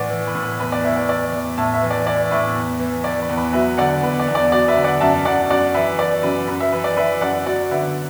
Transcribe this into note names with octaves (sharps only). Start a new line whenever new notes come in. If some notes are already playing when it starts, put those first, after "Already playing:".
Already playing: A2 E3 D5 F#5
E3
B4
A2
B4
E2 B4
D5
E3 B4 E5
D5
E3 D5
E2
A2 E5 A5
B4 E5
E3
D5
E3 D5
A2 B4 E5
E2
E3
E3 D5
B4
E2
B4
F#3 B4 E5
D3 D5 F#5
E2 B4
D5
E2
D5
F#3 D5
B4 E5
D3
D5 F#5
F#2 E5 A5
F#2 D5 F#5
F#2 D5 F#5
E3 B4 E5
E3 D5
F#2 B4
F#2 B4
B4 E5
E3 B4
D5
E3 B4 E5
F#2 D5 F#5
F#3 D5 F#5
D3 B4 E5